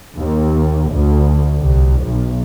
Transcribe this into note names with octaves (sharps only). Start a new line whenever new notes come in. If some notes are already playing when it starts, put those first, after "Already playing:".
D#2
D2
C2
B1